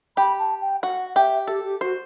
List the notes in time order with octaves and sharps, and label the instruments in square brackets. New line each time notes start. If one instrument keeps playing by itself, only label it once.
[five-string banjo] G4 [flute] B5
[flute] A5
G5
[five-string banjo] F#4 [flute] F#5
[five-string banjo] G4 [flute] E5
[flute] G4 [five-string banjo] A4
[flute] G4
[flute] F#4 [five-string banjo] C5